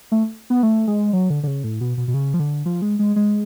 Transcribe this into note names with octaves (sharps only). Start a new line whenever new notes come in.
A3
B3
A3
G#3
F#3
D3
D3
C#3
A2
B2
B2
B2
C#3
F3
D3
F3
G#3
G#3
G#3